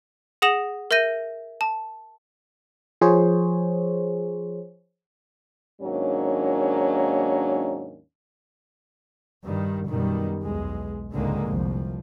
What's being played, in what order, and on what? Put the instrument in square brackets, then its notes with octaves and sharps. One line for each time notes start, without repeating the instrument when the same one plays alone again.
[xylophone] G#4 F#5 D#6 A#6 E7 F#7
A#4 E5 G6 A#6 D#7
A5
[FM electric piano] F3 G#4 C5 C#5
[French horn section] D#2 G#2 F#3 A#3 C#4 D4
[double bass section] G2 D#3 G3
F#2 B2 D#3 G3
B1 E2 G#3
C#2 G#2 D3 D#3 G#3 A#3
F1 C2 F3